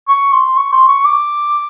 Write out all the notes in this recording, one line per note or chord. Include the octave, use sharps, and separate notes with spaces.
C#6
C6
C#6
C6
C#6
D6